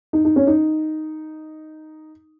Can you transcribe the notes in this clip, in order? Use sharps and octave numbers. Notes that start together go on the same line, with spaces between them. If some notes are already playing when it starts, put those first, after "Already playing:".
D#4
D#4
C#4
D#4